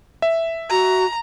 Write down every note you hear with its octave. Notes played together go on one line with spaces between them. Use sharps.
E5
F#4 A#5